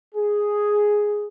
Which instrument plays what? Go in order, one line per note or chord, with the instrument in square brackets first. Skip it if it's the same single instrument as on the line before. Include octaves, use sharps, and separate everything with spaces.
[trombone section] G#4